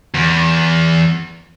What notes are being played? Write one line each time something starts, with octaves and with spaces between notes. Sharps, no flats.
E2